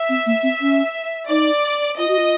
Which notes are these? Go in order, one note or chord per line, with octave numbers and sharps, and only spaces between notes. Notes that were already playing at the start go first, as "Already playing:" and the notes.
Already playing: E5
C4
A#3
C4
C#4
D#4 D5
F4 D#5
F#4
F4